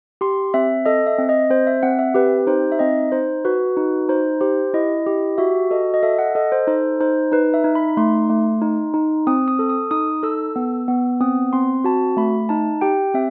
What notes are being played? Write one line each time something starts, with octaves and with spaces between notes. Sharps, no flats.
G4 C6
C4 E5
A4 D#5
E5
C4
D#5
C4 C5
E5
C4 F#5
E5
G4 B4
D#4 C5
E5
C4 D#5
D#4 C5
F#4 B4
D#4
D#4 C5
G4 C5
E4 D#5
G4
F#4 E5
A4 D#5
D#5
A4 E5
F#5
A4 D#5
C5
D#4 C5
D#4 C5
D#4 B4
E5
D#4
B5
A3 C6
A3
D#4
D#4
C4 D#6
D#6
A4
D#6
D#4 D#6
A4 E6
B3
B3
C4 D#6
C4 C6
F#4 A5
A3 B5
D#4 A5
G4 G5
C4 E5